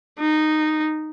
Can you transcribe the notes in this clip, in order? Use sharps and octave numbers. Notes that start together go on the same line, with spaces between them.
D#4